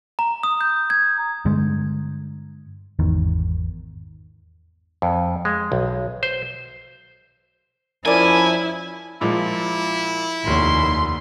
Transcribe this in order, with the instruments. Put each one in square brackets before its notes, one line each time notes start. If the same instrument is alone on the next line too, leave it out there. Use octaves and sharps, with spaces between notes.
[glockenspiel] A#5
D#6
G6
G#6
[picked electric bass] G2 D3 G#3
G#1 E2 D#3
[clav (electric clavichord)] F2
G#3
B1
C5
[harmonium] F3 C#4 [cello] E4 [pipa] A#4 D5 [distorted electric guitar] G#5
[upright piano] A#2 F3 G#3 [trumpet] E4
[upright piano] F1 C#5 [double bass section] D#2 [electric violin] C6